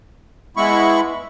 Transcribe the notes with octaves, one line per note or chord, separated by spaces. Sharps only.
G#3 B3 E4 B5 C#6